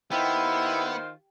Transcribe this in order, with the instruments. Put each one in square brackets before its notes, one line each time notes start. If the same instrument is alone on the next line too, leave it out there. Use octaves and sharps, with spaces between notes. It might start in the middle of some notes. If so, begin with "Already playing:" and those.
[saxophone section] D#3 F4 C5 [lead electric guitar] B3 [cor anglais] E4 [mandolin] G4